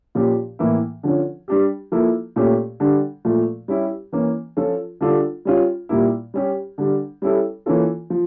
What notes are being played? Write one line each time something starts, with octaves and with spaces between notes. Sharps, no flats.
A#2 F3 C#4 G4
A2 E3 A#3 E4
D3 F3 C#4
G3 D4 G4
F3 A#3 E4 A4
A#2 A3 C#4 G4
D3 G3 D4
A#2 F3 A3
G3 C#4 E4 G4
E3 A#3 C#4
F3 C#4 F4 A4
D3 G3 D4 F4 A4
G3 C#4 F4
A#2 G3 A#3 E4
G3 C#4 G4
D3 G3 D4
G3 C#4 E4 A4
E3 A#3 C#4 F4 A4
F3